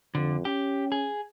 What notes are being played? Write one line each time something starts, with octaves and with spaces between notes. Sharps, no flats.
F2 D3
C#4 G4
G#4